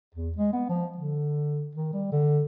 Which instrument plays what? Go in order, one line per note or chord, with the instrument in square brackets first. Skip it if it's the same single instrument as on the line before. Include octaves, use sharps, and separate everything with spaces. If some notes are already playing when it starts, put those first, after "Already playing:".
[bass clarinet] E2
G#3
B3
F3
D3
D#3
G3
D3